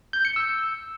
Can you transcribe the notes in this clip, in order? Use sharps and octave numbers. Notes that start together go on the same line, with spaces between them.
G6
C#7
E6